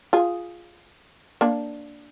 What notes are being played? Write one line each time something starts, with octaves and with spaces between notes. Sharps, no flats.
F4 G#4
A#3 D4